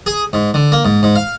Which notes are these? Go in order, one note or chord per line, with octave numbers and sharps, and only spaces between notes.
G#4
G#2
D3
A#3
G#2
G#2
F5